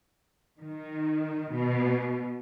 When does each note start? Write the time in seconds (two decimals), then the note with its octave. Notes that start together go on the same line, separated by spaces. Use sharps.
0.58 D#3
1.52 B2